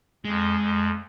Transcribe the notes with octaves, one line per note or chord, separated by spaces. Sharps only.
F2 G#3
F2